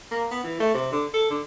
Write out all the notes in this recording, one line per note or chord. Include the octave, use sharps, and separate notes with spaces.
A#3
B3
E3
A3
C3
D3
A4
D3